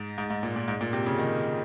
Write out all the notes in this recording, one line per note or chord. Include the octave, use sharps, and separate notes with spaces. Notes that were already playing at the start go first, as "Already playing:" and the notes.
Already playing: G#2
G#2
G#2
A#2
A#2
G#2
A#2
C3
C#3
D#3